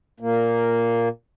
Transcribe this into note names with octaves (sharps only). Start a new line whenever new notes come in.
A#2 A#3